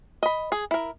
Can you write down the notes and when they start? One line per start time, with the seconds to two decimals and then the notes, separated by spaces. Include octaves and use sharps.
0.23 D#5 B5
0.52 G#4
0.71 E4 A#4